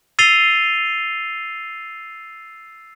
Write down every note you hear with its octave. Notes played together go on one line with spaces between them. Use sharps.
E6 A6 C7 D#7 F7 G7